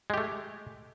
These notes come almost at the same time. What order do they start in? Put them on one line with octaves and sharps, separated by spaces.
G#3 G4 A3